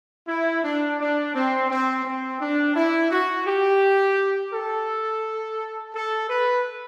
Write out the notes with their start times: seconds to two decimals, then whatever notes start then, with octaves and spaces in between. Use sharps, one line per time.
0.28 E4
0.63 D4
1.00 D4
1.35 C4
1.70 C4
2.05 C4
2.40 D4
2.76 E4
3.11 F#4
3.46 G4
4.53 A4
5.94 A4
6.29 B4